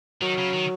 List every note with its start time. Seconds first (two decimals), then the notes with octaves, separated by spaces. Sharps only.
0.21 D#3 F#3
0.38 C#3
0.53 D#3